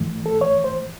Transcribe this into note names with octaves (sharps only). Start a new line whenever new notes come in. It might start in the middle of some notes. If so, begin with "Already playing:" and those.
Already playing: G2 E3 A3
A4
C#5
C5